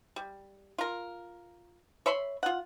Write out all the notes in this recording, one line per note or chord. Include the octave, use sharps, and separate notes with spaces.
G3
F4 A#4
C#5 E5 B5 C6
F4 F#5